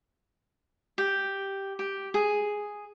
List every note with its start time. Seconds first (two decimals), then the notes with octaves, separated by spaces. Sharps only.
0.98 G4
1.79 G4
2.14 G#4